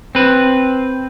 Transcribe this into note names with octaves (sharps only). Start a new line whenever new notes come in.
C4 B4